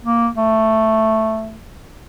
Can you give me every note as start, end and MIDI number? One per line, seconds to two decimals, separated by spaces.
0.04 0.29 58
0.36 1.59 57